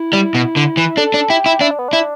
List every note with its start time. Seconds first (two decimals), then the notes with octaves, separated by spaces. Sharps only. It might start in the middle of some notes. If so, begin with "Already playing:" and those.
Already playing: E4
0.13 G3
0.35 B2
0.56 D3
0.77 E3
0.97 D4 A4
1.14 D4
1.29 E4 G4
1.46 E4
1.61 D4 E4
1.71 D4
1.79 B3
1.88 D4 E4